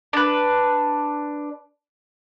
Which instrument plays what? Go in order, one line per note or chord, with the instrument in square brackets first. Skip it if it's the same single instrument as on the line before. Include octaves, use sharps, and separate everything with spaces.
[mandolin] D4 B4